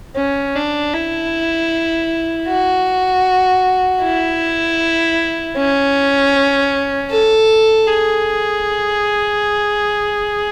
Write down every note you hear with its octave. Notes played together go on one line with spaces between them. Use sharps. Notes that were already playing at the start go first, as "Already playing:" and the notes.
C#4
D4
E4
F#4
E4
C#4
A4
G#4